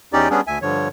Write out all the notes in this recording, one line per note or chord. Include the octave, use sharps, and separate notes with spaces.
E2 C#4 D#4 G4 D5
G3 B3 C#4 D4 G#4
D2 E5 G#5
G2 D3 F3 C#5